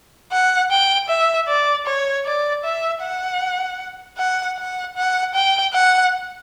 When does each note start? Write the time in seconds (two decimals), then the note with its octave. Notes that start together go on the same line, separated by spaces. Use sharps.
0.32 F#5
0.71 G5
1.09 E5
1.48 D5
1.86 C#5
2.25 D5
2.64 E5
3.02 F#5
4.18 F#5
4.58 F#5
4.96 F#5
5.34 G5
5.74 F#5